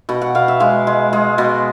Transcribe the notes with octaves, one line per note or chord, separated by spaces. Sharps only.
B2 F#5
F#5
B2 F5
E5
G#3 F5
G#3
G#3
B2